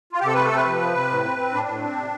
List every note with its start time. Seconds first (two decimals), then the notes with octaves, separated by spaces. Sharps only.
0.12 F4
0.20 G4
0.24 C3 A4
0.35 A3 B4
0.45 A4
0.52 C3 B4
0.66 F3
0.81 C3
0.95 C3
1.10 A2
1.25 C4
1.38 C4
1.54 A2 D4
1.68 A2
1.83 C4
1.97 C3